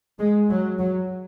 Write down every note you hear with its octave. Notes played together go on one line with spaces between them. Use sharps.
G#3
F#3
F#3